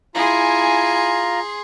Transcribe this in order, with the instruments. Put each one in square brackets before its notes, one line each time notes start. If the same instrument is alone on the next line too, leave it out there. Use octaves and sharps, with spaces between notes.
[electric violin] E4 G#5 [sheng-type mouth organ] F4 A#5 [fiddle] G#4 C6